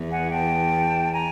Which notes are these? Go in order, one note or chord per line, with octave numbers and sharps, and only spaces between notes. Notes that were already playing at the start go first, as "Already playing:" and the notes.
Already playing: E2
F#5 G#5
G5 A5
G#5 A#5